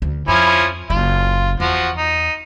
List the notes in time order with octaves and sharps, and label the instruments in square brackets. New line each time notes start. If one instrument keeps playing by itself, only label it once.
[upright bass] D2
[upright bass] F2 [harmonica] F3 C#4 E4
[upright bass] F#1 E4 [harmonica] F4
[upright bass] E2 [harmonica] F3 F#4
[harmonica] D#4